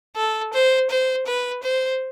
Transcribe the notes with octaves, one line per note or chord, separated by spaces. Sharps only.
A4
C5
C5
B4
C5